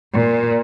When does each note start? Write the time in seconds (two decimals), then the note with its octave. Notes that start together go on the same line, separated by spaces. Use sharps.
0.13 A#2